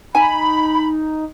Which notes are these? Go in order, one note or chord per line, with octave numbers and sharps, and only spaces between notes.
D#4 G#5 B5